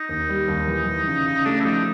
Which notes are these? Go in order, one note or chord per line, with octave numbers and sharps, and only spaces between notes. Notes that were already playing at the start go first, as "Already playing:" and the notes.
Already playing: D#4
D#2
G3
D#2
E3
E3
C#3
C#3
A3 D4
E4
F3 D#4